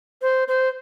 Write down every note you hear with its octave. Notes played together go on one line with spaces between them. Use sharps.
C5
C5